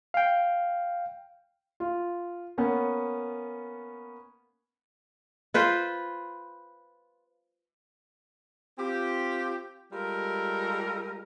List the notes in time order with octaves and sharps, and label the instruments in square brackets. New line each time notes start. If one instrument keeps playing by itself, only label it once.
[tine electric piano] F5 G5
[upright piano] F4
A#3 B3 C#4
[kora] F4 B4 C5
[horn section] C4 F4 G4
G3 G#3 F4 A4 A#4